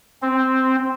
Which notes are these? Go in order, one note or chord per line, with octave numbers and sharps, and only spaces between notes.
C4